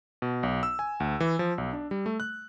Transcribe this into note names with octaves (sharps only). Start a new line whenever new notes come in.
B2
B1
E6
G#5
D2
E3
F3
B1
D4
G3
A3
F#6